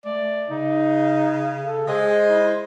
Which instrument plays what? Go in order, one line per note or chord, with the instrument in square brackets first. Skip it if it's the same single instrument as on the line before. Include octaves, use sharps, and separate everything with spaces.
[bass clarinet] A3 [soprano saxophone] D5
[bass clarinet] C#3 [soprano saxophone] D#4
[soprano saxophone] A4
[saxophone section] G#3 D#5 [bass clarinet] G#4 [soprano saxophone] C5
[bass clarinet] E4